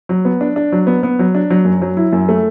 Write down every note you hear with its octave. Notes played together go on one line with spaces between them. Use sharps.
F#3
B3
D4
D4
F#3
B3
B3
F#3
D4
F#3
F#2
F#3
E4
F#2
A3